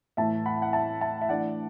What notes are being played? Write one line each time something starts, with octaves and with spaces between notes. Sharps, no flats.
A2 E3 A3 E4 E5 A5
F#5 B5
F#5
E5 A5
E5 A5
E5
E3 A3 D4 D5 F#5